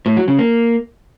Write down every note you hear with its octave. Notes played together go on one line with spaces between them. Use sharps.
A2
F#3
C#3
A#3